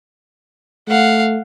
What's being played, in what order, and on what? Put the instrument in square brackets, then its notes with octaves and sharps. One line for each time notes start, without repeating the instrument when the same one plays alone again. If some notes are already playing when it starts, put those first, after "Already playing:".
[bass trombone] A3 [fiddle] F5 F#5